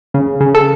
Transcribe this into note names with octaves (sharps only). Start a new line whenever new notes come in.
C#3
C#3
A4